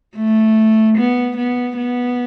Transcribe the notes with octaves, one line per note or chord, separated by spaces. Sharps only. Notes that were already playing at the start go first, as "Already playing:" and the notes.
A3
B3
B3
B3